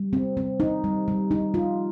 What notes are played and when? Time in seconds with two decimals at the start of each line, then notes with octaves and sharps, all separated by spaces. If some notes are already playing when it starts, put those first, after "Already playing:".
Already playing: G3
0.13 C4
0.37 C4
0.60 D#4
0.84 G3
1.08 G3
1.31 D#4
1.54 F4